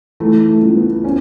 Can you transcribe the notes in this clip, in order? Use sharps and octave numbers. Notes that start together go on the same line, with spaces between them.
E3 A3
A3
C#2
B3
C#4